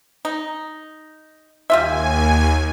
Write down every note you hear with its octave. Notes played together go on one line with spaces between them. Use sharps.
D#4
D#2 G3 F4 E5 G#5